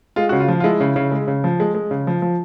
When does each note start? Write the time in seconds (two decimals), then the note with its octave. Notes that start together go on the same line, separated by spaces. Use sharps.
0.16 G#3 F4
0.29 C#3 F#4
0.40 F4
0.48 F3
0.60 F4
0.64 G#3 E4
0.80 C#3
0.96 C#3
1.12 G#3
1.28 C#3
1.44 F3
1.60 G#3
1.75 G#3
1.91 C#3
2.07 F3
2.22 F3